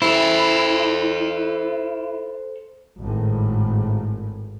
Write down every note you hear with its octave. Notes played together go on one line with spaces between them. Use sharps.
E4 A4 C5
G#1 A2